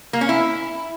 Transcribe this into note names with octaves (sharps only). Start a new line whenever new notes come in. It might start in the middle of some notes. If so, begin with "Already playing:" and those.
A#3
C#4
E4